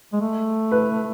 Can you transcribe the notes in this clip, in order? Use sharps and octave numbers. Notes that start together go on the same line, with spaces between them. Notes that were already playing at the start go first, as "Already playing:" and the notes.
G#3
A3
B4